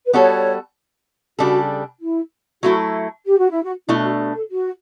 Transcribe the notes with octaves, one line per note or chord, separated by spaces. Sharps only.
B4
G3 B3 F#4 A4 C#5
C#3 G3 D4 F#4 A4
E4
F#3 A3 E4 F#4 A4
G4
F#4
E4
F#4
B2 A3 D4 E4
F#4
G4
A4
F#4